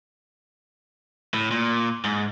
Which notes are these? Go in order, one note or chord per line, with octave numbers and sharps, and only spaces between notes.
A2
A#2
G#2